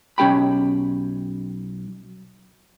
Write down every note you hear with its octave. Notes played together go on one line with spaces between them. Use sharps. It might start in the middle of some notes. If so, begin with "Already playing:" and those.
B1 C#4 G4 G5 B5